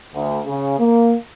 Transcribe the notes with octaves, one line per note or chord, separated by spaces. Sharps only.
D2
C#3
A#3